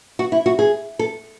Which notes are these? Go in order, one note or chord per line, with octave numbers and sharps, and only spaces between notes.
F#4
E4
F#4
G#4
A4